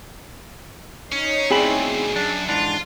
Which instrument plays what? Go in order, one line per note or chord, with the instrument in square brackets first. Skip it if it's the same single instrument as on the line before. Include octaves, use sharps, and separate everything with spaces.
[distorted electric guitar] C#4 [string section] D#4 C#5 C7
[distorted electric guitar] D2 B2 [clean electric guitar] C4 E4 B5 [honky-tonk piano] G#4 D5
[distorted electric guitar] F#2 [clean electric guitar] D4
[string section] F2 [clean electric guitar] G#2 E3 D4 [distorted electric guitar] F4